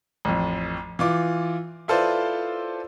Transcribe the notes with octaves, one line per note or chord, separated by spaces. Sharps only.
A1 F2
E3 F4 D6
E4 F4 A4 B4 C5 D5